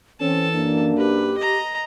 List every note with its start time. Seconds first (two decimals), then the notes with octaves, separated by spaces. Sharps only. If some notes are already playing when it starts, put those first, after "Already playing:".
0.20 E3 C4 C#4 A4 A5
0.54 F#2 A#3 D4
0.97 G4 B4
1.38 D#5 A#5